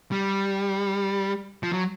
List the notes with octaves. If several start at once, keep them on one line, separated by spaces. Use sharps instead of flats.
G3
F3
F#3